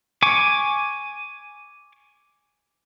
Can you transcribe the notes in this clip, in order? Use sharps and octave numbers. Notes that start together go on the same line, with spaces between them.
G#5 C#6 D6